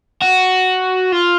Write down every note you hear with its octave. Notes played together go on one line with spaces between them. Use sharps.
F#4
F4